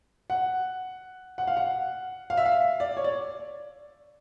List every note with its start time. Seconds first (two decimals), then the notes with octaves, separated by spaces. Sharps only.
0.30 F#5
1.38 F#5
1.47 F5
1.57 F#5
2.30 F5
2.37 E5
2.46 F5
2.80 D5
2.97 C#5
3.04 D5